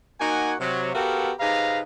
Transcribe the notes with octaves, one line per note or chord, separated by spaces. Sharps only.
A#3 D#4 F#4 F#5 G#5
C3 F#3
B3 F#4 G4 A4 A#4 F5
C3 D#4 G#4 B4 F5 A#5